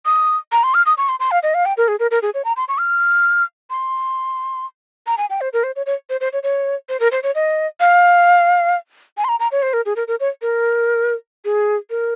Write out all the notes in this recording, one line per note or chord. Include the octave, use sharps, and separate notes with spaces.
D#6
A#5
C6
F6
D#6
C#6
C6
C6
F5
D#5
F5
G5
A#4
G#4
A#4
A#4
G#4
C#5
A#5
C6
C#6
F6
C6
A#5
G#5
G5
C5
A#4
C5
C#5
C#5
C5
C5
C#5
C#5
C5
A#4
C5
C#5
D#5
F5
G#5
C6
A#5
A#5
C#5
C5
A#4
G#4
A#4
A#4
C#5
A#4
G#4
A#4